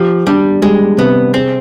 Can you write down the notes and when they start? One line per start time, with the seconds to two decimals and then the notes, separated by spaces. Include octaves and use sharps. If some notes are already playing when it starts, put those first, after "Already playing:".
Already playing: F3 G4
0.27 G3 D4
0.62 G3 G#3
0.98 C3 B3
1.34 C4 G#4